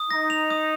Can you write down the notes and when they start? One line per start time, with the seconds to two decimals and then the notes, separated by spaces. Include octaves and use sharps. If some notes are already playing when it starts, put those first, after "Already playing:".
Already playing: D#6
0.11 D#4 A#6
0.30 F7
0.50 D#6